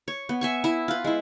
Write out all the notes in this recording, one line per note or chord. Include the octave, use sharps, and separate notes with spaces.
C#5
B3
E5 G#5 C#6
E4 E5
F4 B4
G#3 E4